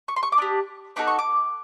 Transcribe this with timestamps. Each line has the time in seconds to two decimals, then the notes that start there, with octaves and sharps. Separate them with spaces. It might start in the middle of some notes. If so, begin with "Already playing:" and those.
0.08 C#6
0.16 C6
0.23 C#6
0.32 D6
0.38 D4 G4 D#6
0.96 B3 D#4 F#4 A4 D6
1.07 C#6
1.19 D6